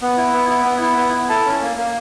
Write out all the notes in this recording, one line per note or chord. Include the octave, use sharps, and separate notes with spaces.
B3
E4
B3
E4
B3
E4
B3
E4
E4 A4 A5
C#4
A#3
A#3